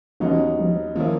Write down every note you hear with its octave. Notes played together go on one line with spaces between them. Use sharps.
D#2 C#3 E3 F#3 B3 D#4
F3
D#3 F3 A#3 C#4 E4